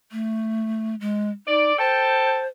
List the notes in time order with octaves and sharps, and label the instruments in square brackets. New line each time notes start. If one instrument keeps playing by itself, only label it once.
[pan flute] A3
G#3
[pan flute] D#4 [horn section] D5
[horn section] A4 G5 A5 [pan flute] C5